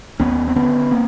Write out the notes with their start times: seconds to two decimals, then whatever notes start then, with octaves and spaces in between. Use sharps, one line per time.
0.20 D#2 B3 C#4
0.47 C4
0.56 D3 B3 C#4
0.91 A#3 C4